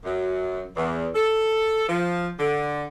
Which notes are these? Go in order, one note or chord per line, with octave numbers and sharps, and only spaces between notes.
F#2
E2
A4
F3
D3